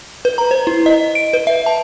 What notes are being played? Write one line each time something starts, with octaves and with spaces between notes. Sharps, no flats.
B4
A#5
C5
E4
D#5
D7
B4
E5
A5